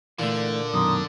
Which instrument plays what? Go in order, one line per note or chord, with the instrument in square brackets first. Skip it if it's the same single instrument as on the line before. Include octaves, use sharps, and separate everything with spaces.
[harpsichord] A#2 [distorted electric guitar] D3 [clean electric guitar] E3 A3
[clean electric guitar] F#2 B2 D#3 [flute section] A#5 C6 D#6